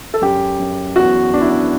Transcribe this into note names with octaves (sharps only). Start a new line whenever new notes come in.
A4
F#2 G4
F#2
E2 F#4
E2 D4
E4
D4